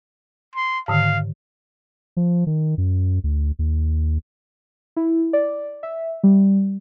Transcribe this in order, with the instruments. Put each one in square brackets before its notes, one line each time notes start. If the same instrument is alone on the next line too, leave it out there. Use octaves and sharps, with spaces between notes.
[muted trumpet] C6
[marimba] G#2 D3 D#3 [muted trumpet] F5
[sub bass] F3
D#3
F#2
D2
D#2
[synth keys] E4
D5
E5
G3